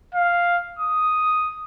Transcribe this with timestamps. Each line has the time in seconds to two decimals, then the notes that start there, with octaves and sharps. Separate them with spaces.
0.15 F5
0.79 D#6